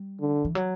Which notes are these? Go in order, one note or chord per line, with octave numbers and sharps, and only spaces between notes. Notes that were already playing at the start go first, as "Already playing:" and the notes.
Already playing: G3
D3
E3
F#3